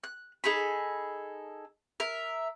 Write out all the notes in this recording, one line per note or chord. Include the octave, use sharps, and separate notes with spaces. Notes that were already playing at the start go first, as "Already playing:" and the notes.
F#6
D#4 G#4 A4 B5
A#4 E5